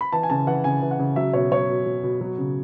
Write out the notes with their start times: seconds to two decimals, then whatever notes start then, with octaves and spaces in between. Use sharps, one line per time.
0.01 B5
0.12 E3 A5
0.23 G#5
0.30 C#3 A5
0.47 E3 F#5
0.64 C#3 G#5
0.82 E3
0.91 F#5
0.99 C#3
1.16 F#3 E5
1.33 B2 C#5
1.51 F#3 C#5
1.69 B2
1.86 F#3
2.03 B2
2.21 F#3
2.38 C#3